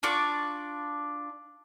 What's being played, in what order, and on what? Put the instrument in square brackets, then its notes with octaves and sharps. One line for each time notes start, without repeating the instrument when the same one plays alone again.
[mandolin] D4 F4 C#6 D6